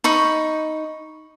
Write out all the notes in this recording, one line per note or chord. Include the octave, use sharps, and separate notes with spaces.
D#4 B5 C#6